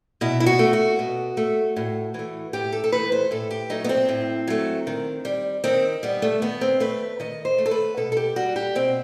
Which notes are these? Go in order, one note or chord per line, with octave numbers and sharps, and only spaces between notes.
B2 E4
E4
F#4
A3
F#4
B2
A3
A2
E3 A3
A2 G4
A4
A4
E3 A3 B4
C5
A2 A4
G4
F#3 A3 D#4
B3
C4
A2
F#3 A3
D#3
G3
D#3 C4
G3 B3
A3
D#3 B3
C4
A3 B4
D#3 D#5
C5
A3
A4
B4
B2 A4
A4
G4
G3 F#4
G4
B2 C4